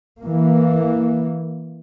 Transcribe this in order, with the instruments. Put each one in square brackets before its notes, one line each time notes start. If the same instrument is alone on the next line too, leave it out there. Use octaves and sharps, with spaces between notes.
[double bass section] E3 A#3